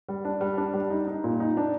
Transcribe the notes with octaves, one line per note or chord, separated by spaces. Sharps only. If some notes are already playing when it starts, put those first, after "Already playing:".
G3
D4
G3
D4
G3
D#4
D#4
A#2
D#4
D4